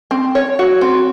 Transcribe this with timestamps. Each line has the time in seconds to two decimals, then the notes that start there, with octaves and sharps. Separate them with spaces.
0.11 C4
0.35 C#5
0.59 F#4
0.81 C4